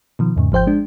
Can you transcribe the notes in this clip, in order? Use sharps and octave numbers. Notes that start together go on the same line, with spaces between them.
B2 D#3 F3
E2 G#2 C#3
G#1 F3 C5 G5 G6
G#3 D4